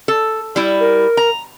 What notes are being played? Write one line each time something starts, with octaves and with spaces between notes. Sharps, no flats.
A4
G3 E4
A#4
A#5